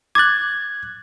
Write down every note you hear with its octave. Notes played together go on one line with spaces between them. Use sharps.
D6 F#6 G#6 A6